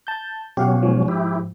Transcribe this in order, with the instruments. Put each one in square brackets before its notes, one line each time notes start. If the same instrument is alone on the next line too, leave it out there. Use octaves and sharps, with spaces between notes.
[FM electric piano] A5 G6
[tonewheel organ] B2 F#3 C#4 [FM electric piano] G4 F5 F#5
[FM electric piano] G#2 F3
[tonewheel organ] E4 G4